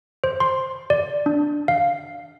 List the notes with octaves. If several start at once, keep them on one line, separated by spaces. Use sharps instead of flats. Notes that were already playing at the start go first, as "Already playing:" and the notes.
C5
C6
D5
D4
F5